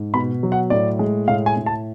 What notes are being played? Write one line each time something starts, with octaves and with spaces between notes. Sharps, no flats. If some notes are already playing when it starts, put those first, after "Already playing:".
Already playing: G#2
B2 B5
F#3
F#5
A2 D5
G#3
A2 F5
G#5
A2
A5